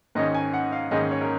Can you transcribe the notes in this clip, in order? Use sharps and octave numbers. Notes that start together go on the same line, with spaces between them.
G#2 D#3 G#3 C#4 D#5
G#5
F#5
F5
G#2 D#3 G#3 C#4 D#5
C#5
A#4